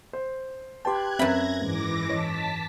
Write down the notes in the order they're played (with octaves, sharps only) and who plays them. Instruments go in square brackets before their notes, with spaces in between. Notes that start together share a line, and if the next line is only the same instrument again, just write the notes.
[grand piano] C5
[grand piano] G4 B4 G5 [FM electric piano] A5 C6 [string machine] F#6 G#6
[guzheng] F#2 B5 [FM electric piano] C4 B4 [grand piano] E5 [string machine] G#6 A#6
[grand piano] G#2 [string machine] E3 D6 A#6
[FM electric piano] C#5 D#5 [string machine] A5 B6